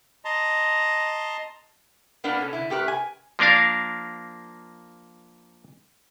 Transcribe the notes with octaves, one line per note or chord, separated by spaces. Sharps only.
D#5 A5 A#5 C6
A#3 B3 D4 A#4
C#4 A4
D3 E4
A3 G4 A#4 B4
G#5
F3 A#3 D4 A#4 F5